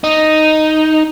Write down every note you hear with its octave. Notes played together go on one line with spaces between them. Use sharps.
D#4